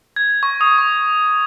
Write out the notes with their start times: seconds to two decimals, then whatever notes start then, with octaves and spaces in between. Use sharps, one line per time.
0.16 G#6
0.43 C#6
0.61 D#6
0.78 C#6